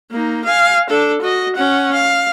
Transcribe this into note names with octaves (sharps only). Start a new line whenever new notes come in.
A#3 D#4
F5 G#5
D4 A4
F#4 D#5
C#4 F#5
F5